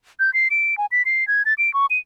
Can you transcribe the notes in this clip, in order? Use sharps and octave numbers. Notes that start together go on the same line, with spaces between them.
G6
C7
D7
G#5
B6
C7
G#6
A6
D7
C#6
D#7